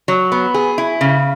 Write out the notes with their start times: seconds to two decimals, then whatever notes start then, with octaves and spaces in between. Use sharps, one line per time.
0.08 F#3
0.32 B3
0.54 G#4
0.78 E4
1.01 C#3